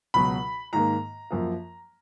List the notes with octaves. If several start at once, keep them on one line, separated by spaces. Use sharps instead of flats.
C#2 B2 F#3 B5
G#2 D#3 A#3 A#5
F#2 F3 A#3